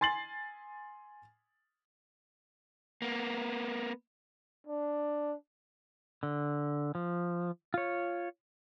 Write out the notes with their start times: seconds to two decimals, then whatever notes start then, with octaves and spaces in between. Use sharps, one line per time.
0.01 G#5 C6 A6 C7 F#7
3.02 A#3 B3
4.67 D4
6.23 D3
6.95 F3
7.74 F4 C#5